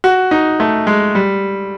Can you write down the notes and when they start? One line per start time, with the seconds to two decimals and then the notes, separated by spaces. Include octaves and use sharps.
0.04 F#4
0.31 D#4
0.60 A3
0.87 G#3
1.15 G3